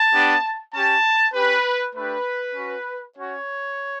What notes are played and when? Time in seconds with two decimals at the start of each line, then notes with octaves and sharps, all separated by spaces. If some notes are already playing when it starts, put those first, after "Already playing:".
Already playing: A5
0.13 B3 D4 G4
0.74 C#4 G4 A5
1.34 C#4 G4 B4
1.95 A3 D4 G4 B4
2.55 C#4 F#4
3.15 C#4 F#4 C#5